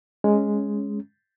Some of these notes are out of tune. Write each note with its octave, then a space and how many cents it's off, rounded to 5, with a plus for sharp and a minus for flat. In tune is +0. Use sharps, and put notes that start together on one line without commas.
G#3 +0 C#4 +0